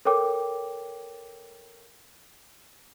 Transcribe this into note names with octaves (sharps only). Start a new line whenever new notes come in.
A4 A#4 C#5 G5 D6